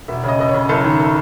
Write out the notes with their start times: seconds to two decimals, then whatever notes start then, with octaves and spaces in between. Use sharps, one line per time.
0.08 E1 E5
0.23 C#3 D#5
0.39 E1 D#5
0.49 C#5
0.54 C#3
0.69 F#1 A4
0.84 D#3
0.99 A4